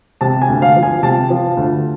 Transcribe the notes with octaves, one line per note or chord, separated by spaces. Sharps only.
C3 A5
G#5
D2
F5
F3
G#5
C3 A5
F3
D2